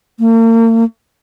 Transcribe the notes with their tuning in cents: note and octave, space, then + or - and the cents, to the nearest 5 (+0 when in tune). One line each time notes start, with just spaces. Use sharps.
A#3 -45